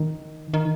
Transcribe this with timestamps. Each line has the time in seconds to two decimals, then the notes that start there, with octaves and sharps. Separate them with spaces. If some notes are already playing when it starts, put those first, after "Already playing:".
Already playing: D#3
0.54 D#3